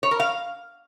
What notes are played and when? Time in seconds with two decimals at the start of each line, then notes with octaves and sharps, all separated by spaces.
0.03 C#5
0.11 A#4
0.20 F5